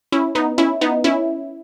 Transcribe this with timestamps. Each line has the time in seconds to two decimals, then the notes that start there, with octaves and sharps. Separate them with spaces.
0.12 C#4 E4
0.35 B3 D#4
0.58 C#4 E4
0.81 B3 D#4
1.04 C#4 E4